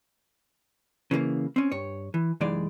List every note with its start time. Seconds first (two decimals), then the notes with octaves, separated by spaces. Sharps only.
1.11 C#3 E3 G#3 A#3
1.56 C4 C#4
1.72 G2 C#5
2.14 E3
2.41 C2 F#2 E3 G#3 D#4 D5